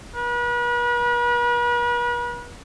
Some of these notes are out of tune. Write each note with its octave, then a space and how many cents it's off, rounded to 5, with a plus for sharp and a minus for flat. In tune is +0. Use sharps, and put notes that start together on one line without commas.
B4 -40